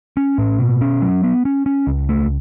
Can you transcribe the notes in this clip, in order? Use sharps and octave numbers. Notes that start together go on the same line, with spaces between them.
C#4
A2
B2
C#4
F#3
B3
C#4
C#4
C#2
A3